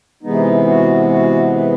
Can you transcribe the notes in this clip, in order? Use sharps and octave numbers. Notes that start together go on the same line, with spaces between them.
C3 E3 G#3 B3 D#4
F#4
F#4
B4